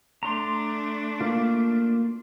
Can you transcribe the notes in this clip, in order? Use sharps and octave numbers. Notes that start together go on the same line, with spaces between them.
A3 D4 A#5 C6
A#3 F4